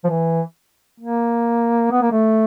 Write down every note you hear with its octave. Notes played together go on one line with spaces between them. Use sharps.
F3
E3
A#3
B3
A#3
A3